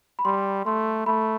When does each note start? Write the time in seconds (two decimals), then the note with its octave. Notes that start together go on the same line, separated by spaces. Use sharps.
0.19 B5
0.25 G3 C6
0.66 A3 C6
1.06 A3 B5